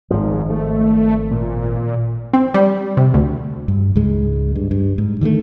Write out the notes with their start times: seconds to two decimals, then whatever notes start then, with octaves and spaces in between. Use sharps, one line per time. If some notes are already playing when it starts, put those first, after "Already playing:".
0.11 G#1 G#2 F3
0.50 A3
1.31 A#2
2.33 C4
2.54 G3
2.97 C3
3.14 D2
3.68 G2
3.96 C#2 G#2 G#3
4.55 G2
4.71 G2
4.98 G#2
5.21 D3 D#3 G3 A3